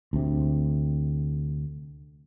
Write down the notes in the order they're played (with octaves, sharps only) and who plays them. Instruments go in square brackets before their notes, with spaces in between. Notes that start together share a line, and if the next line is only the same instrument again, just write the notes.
[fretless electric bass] D2 C3